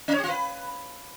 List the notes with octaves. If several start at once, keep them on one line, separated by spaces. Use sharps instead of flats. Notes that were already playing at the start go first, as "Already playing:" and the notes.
C#4
C#5
G4
F4
B4